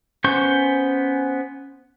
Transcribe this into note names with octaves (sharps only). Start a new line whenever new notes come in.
B3 C#4 C5 C#6 G6